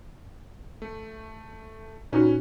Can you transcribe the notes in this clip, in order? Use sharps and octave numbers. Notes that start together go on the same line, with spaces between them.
A3
A#2 C#4 D#4 F#4 B4